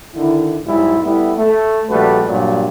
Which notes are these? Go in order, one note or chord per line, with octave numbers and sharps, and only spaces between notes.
D3 D#3 E4
B1 G#2 G3 G#3 E4
G3 A3 B3 E4
A3
A#1 G3 A3 F#4 B4
G2 A#2 F#3 G3